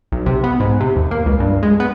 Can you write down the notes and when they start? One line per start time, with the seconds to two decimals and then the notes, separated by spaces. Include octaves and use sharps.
0.12 B1
0.26 C3
0.44 B3
0.60 G#2
0.80 C3
0.96 D#2
1.11 A#3
1.26 C#2
1.40 G2
1.63 G#3
1.80 B3